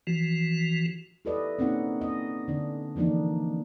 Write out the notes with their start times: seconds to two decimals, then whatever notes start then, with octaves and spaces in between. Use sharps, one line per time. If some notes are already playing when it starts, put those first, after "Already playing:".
0.07 E3 F3 F#4
1.25 E4 G4 A4 B4 D5 D#5
1.59 A#3 C4 C#4 D#4 F#5
2.01 D#5
2.48 D3 D4
2.96 E3 F3 A#3 D4 D#4